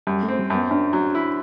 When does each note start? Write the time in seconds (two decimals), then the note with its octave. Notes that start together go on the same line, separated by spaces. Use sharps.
0.07 F#2 G3
0.23 A3
0.28 C4
0.39 G3
0.50 F#2 B3
0.71 F#2 D4
0.93 F#3
1.15 E4